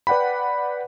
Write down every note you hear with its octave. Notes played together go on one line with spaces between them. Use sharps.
B4 D5 F#5 G5 B5